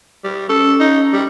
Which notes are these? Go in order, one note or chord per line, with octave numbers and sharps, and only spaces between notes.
G3
C#4 A4
D#4
G3